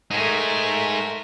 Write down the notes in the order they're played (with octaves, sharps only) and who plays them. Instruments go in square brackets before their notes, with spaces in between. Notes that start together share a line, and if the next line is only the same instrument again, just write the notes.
[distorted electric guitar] G#3 D#4 [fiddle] A3 A#4